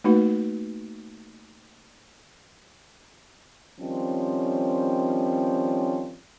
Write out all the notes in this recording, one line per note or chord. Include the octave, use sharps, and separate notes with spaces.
A3 A#3 D#4 F#4 B4
D#3 F3 G3 C4 C#4